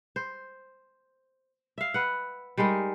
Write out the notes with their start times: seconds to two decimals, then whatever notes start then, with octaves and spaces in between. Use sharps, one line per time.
0.16 C5
1.78 E5 F5
1.94 B4 F#5
2.58 G3 G#3 D#4 A#4